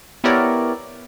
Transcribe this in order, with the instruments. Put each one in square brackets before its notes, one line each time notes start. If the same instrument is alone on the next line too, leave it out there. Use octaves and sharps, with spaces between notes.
[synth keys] B3 E4 G4 A#4 C#5 D5